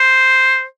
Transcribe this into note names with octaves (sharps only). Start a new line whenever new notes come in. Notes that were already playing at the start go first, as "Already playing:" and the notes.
Already playing: C5